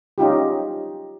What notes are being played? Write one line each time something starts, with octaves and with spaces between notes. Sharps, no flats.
C#4 D#4 F4 G4